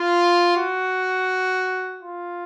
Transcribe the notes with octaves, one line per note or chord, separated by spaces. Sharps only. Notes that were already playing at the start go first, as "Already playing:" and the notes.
Already playing: F4
F#4
F4